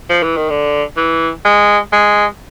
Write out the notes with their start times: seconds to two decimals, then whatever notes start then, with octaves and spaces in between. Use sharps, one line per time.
0.09 F3
0.23 E3
0.37 D#3
0.50 D3
0.97 E3
1.45 G#3
1.92 G#3